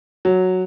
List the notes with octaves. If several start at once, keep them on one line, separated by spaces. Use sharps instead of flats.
F#3